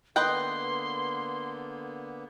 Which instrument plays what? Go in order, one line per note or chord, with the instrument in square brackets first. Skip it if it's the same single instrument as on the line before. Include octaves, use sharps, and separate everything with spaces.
[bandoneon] D3 A#3 B3 [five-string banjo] B4 D#5 G5 [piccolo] C6